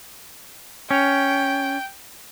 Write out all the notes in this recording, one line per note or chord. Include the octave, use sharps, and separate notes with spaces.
C#4 G5